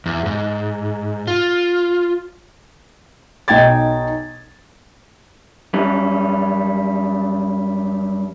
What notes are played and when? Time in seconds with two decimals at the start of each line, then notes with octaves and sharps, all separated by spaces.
0.06 E2
0.26 G#2
1.27 F4
3.48 B1 D#4 G5 G#6 A6
5.74 F#2 G3 C#4